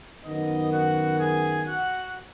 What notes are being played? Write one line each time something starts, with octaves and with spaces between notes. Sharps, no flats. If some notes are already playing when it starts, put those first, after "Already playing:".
F#2 D#3 B3 D#4 D#5
F#4 F#5
G#4 G#5
F#4 F#5